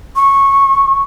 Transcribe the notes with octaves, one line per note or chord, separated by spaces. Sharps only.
C#6